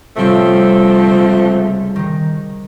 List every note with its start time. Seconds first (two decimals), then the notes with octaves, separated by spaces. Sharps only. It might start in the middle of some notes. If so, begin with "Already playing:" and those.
0.17 C3 F3 G3 A3 C4 C#4
1.07 C#2
1.96 D#3 D#4